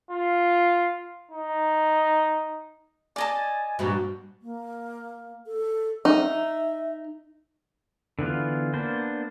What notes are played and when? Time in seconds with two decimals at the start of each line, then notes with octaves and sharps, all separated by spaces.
0.11 F4
1.31 D#4
3.16 D5 D#5 G#5 A5
3.79 G2 A#2 F3 F#4
4.42 A#3
5.47 A4
6.05 D#4 E5
8.19 D3 E3 B3 F4
8.74 A#3 B3 D4 C5